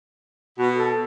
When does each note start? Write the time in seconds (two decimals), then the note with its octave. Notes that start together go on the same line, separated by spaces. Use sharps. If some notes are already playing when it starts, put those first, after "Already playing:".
0.59 B2 F#4
0.74 A4